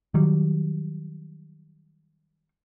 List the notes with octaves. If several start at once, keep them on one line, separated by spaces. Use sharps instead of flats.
D#3 F#3 G3